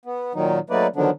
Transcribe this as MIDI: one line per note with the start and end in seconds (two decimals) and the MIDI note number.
0.05 0.33 59
0.35 0.59 46
0.35 0.59 51
0.35 0.59 54
0.35 0.59 63
0.70 0.87 54
0.70 0.87 57
0.70 0.87 58
0.70 0.87 63
0.70 0.87 71
0.70 0.87 74
0.96 1.10 50
0.96 1.10 51
0.96 1.10 53
0.96 1.10 54
0.96 1.10 59
0.96 1.10 62